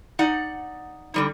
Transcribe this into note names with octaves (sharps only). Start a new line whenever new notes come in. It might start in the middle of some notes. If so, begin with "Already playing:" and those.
D#4 D5 F#5
D3 G3 D#4